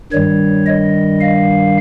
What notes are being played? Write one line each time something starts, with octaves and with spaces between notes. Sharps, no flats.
G2 D#3 G3 C#5
D#5
F5